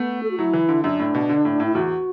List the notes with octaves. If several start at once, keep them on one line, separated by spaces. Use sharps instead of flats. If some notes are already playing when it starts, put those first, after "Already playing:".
Already playing: A3 B3
A4
F#4
F#3 E4
E3
D3
F#2 D4
A2
B2
D3
A2
A2
E4
E2 F#4